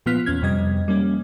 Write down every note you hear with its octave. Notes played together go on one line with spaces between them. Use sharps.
A#2 F3 B3 F4 F6 B6
E2 C#4 F6 G#6
F2 C3 G3 D#5 G#6
G3 A#3 C#4